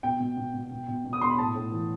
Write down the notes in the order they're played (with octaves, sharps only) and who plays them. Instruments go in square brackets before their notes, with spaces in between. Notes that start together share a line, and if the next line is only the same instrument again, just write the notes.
[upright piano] B2 G5
B2
B2
B2
B2
B2
B2
D#6
B2 C6
B5
A2 A5
A2
E3